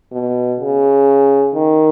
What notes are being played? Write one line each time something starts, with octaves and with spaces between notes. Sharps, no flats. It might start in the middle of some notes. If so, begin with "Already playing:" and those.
B2
C#3
D#3